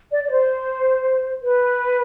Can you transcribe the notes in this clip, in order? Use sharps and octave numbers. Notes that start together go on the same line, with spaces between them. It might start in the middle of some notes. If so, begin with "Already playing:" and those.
D5
D5
C5
B4